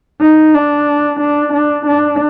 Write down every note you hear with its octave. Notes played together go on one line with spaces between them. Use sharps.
D#4
D4
D4
D4
D4